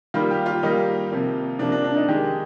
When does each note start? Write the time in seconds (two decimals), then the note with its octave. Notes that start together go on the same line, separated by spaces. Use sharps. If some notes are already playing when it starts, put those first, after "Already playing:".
0.14 D#3 G3 A#3 F4
0.31 G4
0.46 F4
0.63 D#3 G3 A#3 D#4
1.11 C3 F3 A#3
1.59 C3 F3 A#3 D4
1.72 D4
1.84 D4
1.97 D#4
2.08 D#3 G#3 G4